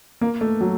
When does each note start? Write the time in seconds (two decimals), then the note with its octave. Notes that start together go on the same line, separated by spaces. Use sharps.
0.21 A#3
0.41 A3
0.61 F#3